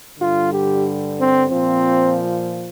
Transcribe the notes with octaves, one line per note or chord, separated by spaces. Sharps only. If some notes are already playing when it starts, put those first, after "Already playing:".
G2 D3 G3 F4
G4
C4
A#2 F3 C4